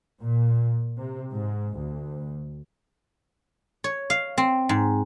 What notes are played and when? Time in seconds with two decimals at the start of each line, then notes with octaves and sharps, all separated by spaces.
0.21 A#2
0.98 C3
1.32 G#2
1.76 D2
3.84 C#5
4.10 F5
4.38 C4
4.69 G#2